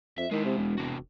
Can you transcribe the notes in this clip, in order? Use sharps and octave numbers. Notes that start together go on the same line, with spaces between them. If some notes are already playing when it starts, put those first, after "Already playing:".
F2 E5
D#3 G#3 E4
C3
E1
C3 F#4